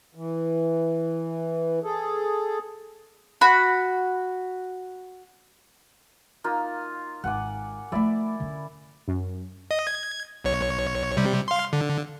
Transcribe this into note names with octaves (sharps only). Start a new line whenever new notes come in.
E3
G#4 A4
F#4 B5
A#3 D#4 F4
G#1 F#5 G#5 D6
F3 A3 E4 D5 E5
D3 C#4
F#2
D#5
G#6
B1 C#5
C3 G3
F5 C6
D3